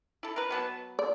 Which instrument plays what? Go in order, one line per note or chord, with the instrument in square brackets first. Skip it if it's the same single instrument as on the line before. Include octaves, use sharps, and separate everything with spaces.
[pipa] E4 A4
A#4 B4
F#3 B3 A5
[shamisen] D5